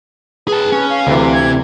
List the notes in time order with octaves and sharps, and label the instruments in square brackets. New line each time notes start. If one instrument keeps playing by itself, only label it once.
[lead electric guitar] G#4 A5 [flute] B4
[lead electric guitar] C#4
[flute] F5
[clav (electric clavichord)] D2 E3 [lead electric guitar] C3
[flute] G#6